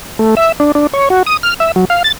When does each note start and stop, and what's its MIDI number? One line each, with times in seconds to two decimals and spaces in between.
0.19 0.35 57
0.37 0.52 76
0.60 0.72 62
0.75 0.87 62
0.94 1.09 73
1.10 1.23 66
1.27 1.37 87
1.43 1.54 89
1.60 1.72 76
1.76 1.85 54
1.90 2.03 77
2.04 2.12 93